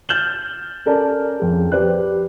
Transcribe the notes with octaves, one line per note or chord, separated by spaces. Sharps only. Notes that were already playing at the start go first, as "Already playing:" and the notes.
F6 G6 A6 E7 F#7 G7
C#4 A4 A#4 D5 A5
F2 G#4
G4 B4 C5 D5 F#6